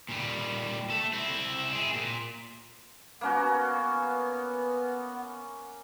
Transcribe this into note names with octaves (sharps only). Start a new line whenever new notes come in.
A#2 G3
A3 A4
C4 E4
C4 G#4
A#2
A#3 B3 C#4 F#4